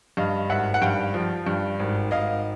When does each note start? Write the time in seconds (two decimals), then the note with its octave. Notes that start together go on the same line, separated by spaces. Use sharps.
0.17 G2 D#5 F5
0.49 G#1 E5 F#5
0.74 F#5
0.82 G2 F5 G5
1.14 F3
1.47 G2
1.80 G#1
2.11 G#1 D#5 F5